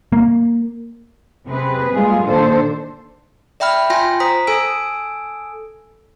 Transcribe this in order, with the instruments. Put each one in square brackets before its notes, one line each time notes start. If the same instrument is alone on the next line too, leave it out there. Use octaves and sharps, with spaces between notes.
[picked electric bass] A#3
[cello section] C3 C4 G#4 B4
G3 G#3 A#3 F4 G#4
A#2 D#3 D4 A4 C5
[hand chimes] D5 E5 G5 B5 F6
F4 G5 G#5 C6 A#6
C5 A#5 D#6 B6
A4 G#5 E6 D7